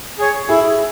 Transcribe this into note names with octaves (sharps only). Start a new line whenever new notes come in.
G#4 C#5
E4 G#4